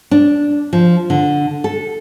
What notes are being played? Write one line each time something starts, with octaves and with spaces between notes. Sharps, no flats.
D4
F3
D3
A4